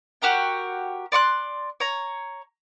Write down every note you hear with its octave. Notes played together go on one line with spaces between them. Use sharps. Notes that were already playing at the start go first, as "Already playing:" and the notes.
F#4 G4 A#4 G5
D5 C6 C#6 F#6
C#5 A#5